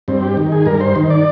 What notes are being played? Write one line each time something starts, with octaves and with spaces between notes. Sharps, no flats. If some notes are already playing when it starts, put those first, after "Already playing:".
G2 C4
G4
D#3
G#4
G2 A#4
C5
D#3
D5